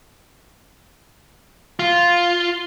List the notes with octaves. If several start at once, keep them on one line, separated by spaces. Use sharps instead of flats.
F4